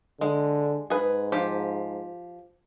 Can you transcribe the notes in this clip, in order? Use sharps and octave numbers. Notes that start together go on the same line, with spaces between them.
D3 G#3
G#2 G#4 B4
F3 G4